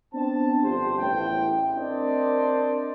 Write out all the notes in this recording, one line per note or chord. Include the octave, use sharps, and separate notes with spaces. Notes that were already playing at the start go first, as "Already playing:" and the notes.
B3 C4 D4 A5
G1 F2 G4 C5
A1 E2 A2 G5
C4 D4 A#4 C5 D5 D#5